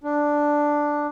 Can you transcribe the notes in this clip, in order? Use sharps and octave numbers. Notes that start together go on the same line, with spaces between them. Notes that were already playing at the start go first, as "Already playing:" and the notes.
D4